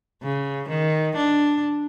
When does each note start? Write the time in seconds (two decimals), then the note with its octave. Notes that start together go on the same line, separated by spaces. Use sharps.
0.23 C#3
0.69 D#3
1.16 D4